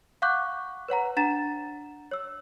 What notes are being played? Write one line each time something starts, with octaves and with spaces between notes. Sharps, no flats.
F5 F#5 C#6 D6 F#6 G6
B4 C#5 F#5 A#5
D4 F#5 A#5 A6 E7
C#5 E6